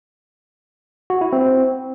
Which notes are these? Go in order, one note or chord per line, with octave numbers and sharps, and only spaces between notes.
F#4
E4
C4